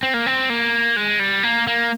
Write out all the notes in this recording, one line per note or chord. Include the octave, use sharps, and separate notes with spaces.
C4
A#3
C4
A#3
G#3
G3
A#3
A#3